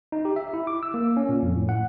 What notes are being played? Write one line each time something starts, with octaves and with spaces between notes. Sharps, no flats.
D#4
G4
E5
E4
D6
E6
A#3
C#4
A#2
F2
A2
F#5